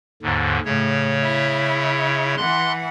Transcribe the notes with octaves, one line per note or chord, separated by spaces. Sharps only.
D#2 G#2 D3
A2 C#3 C#5
E4
E3 F#5 C6 F#6